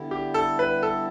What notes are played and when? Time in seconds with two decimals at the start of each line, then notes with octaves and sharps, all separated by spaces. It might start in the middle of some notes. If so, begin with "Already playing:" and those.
Already playing: D3 G3 B3 E4
0.11 G4
0.34 A4
0.59 B4
0.83 A4